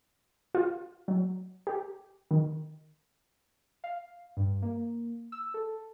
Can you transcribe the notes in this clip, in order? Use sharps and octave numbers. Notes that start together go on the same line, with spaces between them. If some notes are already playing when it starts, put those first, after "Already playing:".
F4
F#3
G4
D#3
F5
G2
A#3
E6
A4